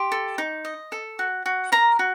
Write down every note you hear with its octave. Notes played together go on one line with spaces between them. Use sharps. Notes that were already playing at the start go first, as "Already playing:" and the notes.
Already playing: G4 C6
A4
D#4
D#5
A4
F#4
F#4
A#4 A#5
F#4